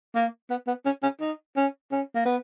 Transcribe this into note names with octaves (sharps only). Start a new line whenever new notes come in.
A#3
B3
B3
C#4
C#4
D#4
C#4
C#4
A#3
B3